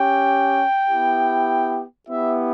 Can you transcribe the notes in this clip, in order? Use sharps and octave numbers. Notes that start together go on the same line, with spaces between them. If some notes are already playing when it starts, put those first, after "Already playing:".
Already playing: C#4 G4 G5
B3 E4 G4
B3 E4 G4 E5